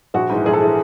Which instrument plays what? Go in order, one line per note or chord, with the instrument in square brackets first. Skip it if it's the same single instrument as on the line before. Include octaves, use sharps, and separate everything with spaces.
[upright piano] A#1 F#4
G#2 E3
A#1 G#4
A4
E3 G#4